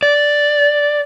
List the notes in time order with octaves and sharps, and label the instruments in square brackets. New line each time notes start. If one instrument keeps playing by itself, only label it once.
[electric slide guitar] D5